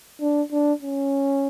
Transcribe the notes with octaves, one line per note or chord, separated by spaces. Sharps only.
D4
D4
C#4